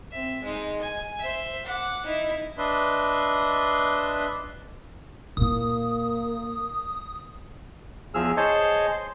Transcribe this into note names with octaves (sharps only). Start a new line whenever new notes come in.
C4 E5
G#3 D#4
G#5
C5 E5
F#5 D6
D#4 E4
D4 B4 D#5 E5 C6
A#2 A#3 E4 D#6
E2 F3 G#4 E6 F6
G#4 C5 C#5 D#5 A5 C#6
C6